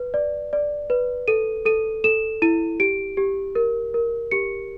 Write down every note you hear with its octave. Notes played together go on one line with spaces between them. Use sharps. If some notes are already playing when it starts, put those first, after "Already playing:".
Already playing: B4
D5
D5
B4
A4 D#7
A4 D#7
A4 E7
E4 D#7
G4 D7
G4
A#4
A#4
G4 C#7